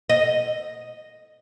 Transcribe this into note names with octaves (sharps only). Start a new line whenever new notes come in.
D#5